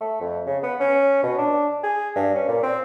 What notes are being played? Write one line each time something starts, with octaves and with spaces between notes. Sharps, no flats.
A3
F2
C#3
B3
C#4
B2
D4
G#4
G2
C#4
A#2
C4